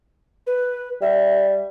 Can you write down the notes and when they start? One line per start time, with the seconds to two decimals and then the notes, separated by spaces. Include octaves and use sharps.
0.47 B4
1.02 G3 E5